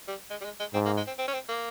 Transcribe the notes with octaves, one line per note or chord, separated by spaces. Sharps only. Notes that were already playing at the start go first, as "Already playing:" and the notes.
G3
G#3
G3
G#3
G#3
G#2 C4
A#3
G#3
C4
C4
C#4
C4
A#3